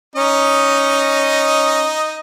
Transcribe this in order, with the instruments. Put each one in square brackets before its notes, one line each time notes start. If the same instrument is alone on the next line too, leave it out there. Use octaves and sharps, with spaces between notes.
[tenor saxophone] C#4 [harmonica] D#4 D#5